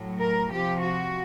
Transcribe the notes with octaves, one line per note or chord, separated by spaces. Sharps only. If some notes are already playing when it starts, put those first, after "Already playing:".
Already playing: A2 F#3
A#4
C3 F3 G4
F#4